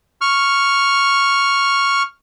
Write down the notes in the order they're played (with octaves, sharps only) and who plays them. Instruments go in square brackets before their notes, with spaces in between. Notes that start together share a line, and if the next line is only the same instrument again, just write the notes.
[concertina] C#6 F6